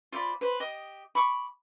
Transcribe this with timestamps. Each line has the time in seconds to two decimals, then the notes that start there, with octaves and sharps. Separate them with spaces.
0.12 F4 C5 D5 B5
0.41 B4 C5 B5
0.60 G4 D#5 D#6
1.15 B5 C#6 D6